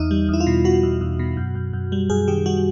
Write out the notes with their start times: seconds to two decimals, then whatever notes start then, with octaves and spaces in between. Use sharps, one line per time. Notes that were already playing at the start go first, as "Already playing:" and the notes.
Already playing: E2 D#4
0.11 G3
0.29 E2 E4
0.40 F4
0.47 B2
0.64 B2 F#4
0.83 E2
1.01 E2
1.19 B2
1.37 F#2
1.55 F#2
1.73 F#2
1.92 G3
2.10 F#2 G#4
2.28 D#3 G4
2.46 G3 F#4